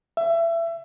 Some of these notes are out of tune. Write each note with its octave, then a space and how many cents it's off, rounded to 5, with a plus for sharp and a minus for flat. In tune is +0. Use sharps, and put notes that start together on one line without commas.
E5 +25